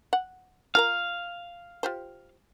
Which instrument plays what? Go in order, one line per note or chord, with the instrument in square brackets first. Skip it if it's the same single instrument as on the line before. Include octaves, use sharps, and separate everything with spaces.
[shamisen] F#5
[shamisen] F4 A#4 A#5 [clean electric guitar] F5
[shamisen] F4 G4 C5